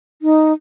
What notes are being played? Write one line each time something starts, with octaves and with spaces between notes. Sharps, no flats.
D#4